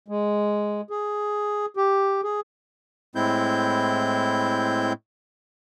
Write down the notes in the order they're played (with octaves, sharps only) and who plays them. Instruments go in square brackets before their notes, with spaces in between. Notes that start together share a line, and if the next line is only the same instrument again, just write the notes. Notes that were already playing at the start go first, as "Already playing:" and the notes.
[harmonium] G#3
G#4
G4
G#4
[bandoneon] A2 G#3 C4 E4 G6